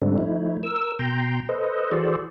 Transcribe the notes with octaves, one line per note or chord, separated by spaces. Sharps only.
G#2 D3 G3 A3 C4 D4
F3 A3 D#4 E4
A#4 E6
B2 G5 A#5 C6
A4 B4 C5 D#5
E3 F#4 G#4 A4 C5 D5